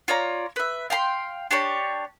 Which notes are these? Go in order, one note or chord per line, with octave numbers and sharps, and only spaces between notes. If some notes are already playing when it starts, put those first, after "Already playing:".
F4 C#5 D5 A#5
B4 E5
F5 G5 A#5 C6
D4 G4 C#5 A5